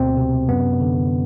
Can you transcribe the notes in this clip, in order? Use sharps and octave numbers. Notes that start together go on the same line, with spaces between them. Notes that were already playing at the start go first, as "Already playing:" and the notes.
Already playing: D2 B2 C4
C3
F#2 B3
D3